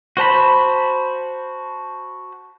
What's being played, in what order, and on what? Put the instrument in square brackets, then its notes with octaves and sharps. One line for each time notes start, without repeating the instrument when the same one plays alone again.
[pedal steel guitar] F#4 C5 A5 B5